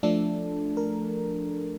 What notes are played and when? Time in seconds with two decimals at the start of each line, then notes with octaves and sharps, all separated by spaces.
0.03 F3 A3 D4 A4
0.77 A#4